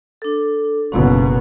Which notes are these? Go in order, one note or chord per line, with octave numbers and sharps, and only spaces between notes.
D4 A4
F#1 B2 C#4 A#5